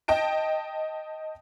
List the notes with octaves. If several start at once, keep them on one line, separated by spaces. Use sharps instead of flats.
D#5 G5 A5 D7